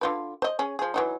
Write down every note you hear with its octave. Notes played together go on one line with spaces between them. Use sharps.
D3 F4 B4
C5 D#5
C#4 G#4
F3 G#4
E3 F#3 D#4